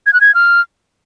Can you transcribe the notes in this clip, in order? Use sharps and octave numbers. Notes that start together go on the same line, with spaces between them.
G#6
F#6
G#6
F6